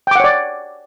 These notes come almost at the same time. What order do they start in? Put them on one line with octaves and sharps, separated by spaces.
G5 D6 F#5 C#5 D5